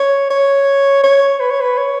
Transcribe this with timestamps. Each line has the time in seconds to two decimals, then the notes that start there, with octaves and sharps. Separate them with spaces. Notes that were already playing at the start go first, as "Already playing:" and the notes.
Already playing: C#5
0.30 C#5
1.04 C#5
1.40 B4
1.51 C#5
1.61 B4
1.77 C#5